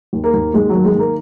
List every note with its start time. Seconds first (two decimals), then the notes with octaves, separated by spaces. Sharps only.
0.13 D#2
0.24 A#3
0.34 D#2
0.54 D#2 G#3
0.69 D#3 F#3
0.84 G#3
0.95 D#3 A#3